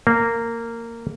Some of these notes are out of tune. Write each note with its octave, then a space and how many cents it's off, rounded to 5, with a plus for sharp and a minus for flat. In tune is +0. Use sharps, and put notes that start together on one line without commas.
A#3 -15